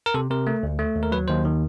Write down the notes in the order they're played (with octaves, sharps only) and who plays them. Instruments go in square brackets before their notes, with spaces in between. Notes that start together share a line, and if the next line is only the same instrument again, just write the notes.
[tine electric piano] A#4
C3 A4
C3 A#4
A3
D2
A3
D#2
A#4
F#3 B4
D#2 C5
D#3